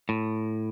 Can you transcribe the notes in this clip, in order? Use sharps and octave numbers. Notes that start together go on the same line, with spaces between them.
A2